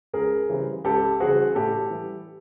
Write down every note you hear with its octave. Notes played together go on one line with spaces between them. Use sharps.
C#2 G#4 A#4
C#3 E3 G3 C4
C#2 G4 A4
C#3 E3 G3 C4 F#4 G#4
A2 G4 A4
E3 G3